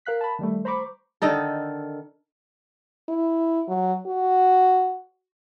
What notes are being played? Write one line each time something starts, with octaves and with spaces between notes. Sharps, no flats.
A#4 F5 F#6 B6
A5 B5
D#3 G3 A3
C5 A#5 B5 C#6 D6
D3 D#3 D#4 A4
E4
F#3
F#4